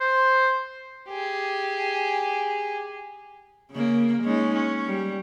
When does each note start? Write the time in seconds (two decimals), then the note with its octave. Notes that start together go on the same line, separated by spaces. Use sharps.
0.01 C5
1.09 G4 G#4
3.72 C#3 A#3
4.22 G#3 C#4 D#4
4.55 C#4
4.86 G3